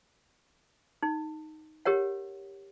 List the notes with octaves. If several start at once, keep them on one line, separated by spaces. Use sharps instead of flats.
D#4
G4 A#4 C#5 F#5